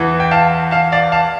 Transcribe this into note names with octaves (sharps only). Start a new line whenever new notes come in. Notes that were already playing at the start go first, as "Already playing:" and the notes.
Already playing: E2 E3
G5
F5 A5
F5 A5
D5 F5
F5 A5